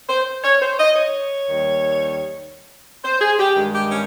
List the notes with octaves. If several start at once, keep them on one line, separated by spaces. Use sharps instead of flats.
C5
C#5
C5
D#5
C#5
D#2 D#3 G3
C5
G#4
G4
G2 D#3 G#3
G4
C#4